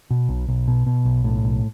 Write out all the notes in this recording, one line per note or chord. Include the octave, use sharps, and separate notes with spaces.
B2
B1
B1
B2
B2
B1
A2
B1